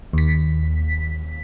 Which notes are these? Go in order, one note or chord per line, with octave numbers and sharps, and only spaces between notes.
D#2 B6